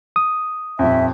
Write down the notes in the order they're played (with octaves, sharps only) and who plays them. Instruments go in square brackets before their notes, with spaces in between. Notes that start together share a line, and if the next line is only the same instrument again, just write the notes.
[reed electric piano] D#6
[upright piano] D#1 F2 [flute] E5